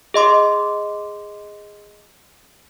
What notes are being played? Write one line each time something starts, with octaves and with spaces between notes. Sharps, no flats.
G#4 D#5 C6 D6